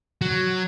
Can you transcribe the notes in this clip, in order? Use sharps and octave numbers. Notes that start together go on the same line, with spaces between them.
F#3